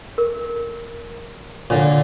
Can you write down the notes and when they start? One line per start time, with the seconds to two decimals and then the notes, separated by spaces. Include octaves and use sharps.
0.18 A#4
1.70 A#2 D3 C#5